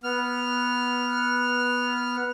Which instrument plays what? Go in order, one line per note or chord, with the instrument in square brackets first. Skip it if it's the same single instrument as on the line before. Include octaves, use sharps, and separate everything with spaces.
[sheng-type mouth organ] B3 F6